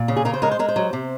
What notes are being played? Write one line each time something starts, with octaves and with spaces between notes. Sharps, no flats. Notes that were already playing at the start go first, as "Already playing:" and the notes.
Already playing: A#2
C#3
G#4
C#3 A#4
C5
G#3 A#4
C5
G#3 A#4
C5
F#3
C3